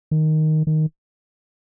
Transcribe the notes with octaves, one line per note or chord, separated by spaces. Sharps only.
D#3
D#3